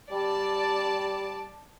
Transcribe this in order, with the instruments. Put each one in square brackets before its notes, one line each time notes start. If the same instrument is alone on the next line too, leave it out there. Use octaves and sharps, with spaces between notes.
[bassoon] G3 [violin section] D5 A5